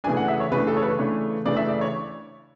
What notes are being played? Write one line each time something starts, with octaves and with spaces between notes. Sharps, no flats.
C#3 E3 A3 D4 G#5
F#5
E5
C#5
C#3 E3 A3 D4 B4
A4
C#5
B4
C#3 E3 A3 D4 C#5
C#3 E3 A3 D4 D5
E5
D5
C#5